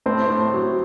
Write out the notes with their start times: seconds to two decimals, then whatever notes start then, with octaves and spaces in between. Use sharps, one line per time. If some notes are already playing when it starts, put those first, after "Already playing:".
0.06 A2 C4
0.30 A2
0.53 F#3